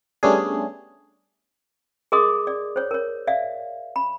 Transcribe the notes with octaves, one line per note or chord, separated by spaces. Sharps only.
G3 A3 B3 C#4 D4 G#4
G#4 A#4 D#5 C6 D6 D#6
D5
C5 C#5
A#4 C#5
D5 E5 F5
B5